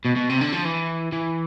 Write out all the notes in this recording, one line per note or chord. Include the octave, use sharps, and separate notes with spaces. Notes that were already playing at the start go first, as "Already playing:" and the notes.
B2
B2
C3
D3
F3
E3
E3